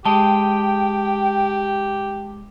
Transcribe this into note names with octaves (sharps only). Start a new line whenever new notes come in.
G#3 G4 D#5 G5 A5